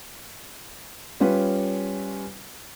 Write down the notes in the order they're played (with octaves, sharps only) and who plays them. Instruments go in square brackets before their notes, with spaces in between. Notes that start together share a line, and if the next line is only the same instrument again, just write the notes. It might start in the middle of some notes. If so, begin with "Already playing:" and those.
[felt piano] G3 C#4 F4 B4 C#5